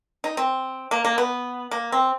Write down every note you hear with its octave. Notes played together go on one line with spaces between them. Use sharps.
D#4
C4
A#3
A#3
B3
A#3
C4